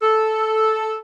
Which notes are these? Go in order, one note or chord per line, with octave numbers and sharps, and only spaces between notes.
A4